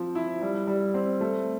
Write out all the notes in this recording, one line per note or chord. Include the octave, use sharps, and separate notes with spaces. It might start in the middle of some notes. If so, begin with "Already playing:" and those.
Already playing: F3 C4
E4
G3
G3
C4
A3